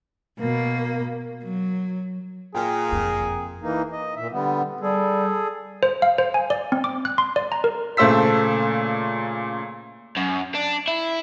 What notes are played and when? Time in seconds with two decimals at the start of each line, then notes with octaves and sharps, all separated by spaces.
0.39 B2 A#3
1.43 F#3
2.54 A#2 G#4 A#4 G5 G#5
2.92 F#1 F2
3.62 E3 A#3 D#4
3.92 D#5
4.16 A#2 E5
4.31 D3 G3 B3
4.81 G3 G#4 A4
5.83 C5
6.02 F5
6.18 C5
6.34 G#5
6.50 D5
6.72 C4
6.84 D6
7.05 F#6
7.18 C6
7.36 D5
7.52 A#5
7.64 A#4
7.97 A#2 C#3 A3 C5 E6 B6
10.17 F#2
10.55 D4
10.88 E4